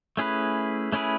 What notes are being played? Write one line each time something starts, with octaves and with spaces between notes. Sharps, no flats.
A3 C#4 E4 G#4 B4
A3 C#4 E4 G#4 B4